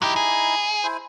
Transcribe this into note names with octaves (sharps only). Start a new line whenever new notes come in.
F#3 D#4 E4 G4 A#5
G#4
E4 C5